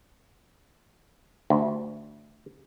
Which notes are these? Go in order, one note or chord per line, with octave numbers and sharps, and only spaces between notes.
D2